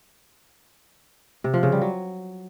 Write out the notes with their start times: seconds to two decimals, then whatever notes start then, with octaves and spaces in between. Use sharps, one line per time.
1.44 C3
1.54 F3
1.63 C#3
1.72 G3
1.81 F#3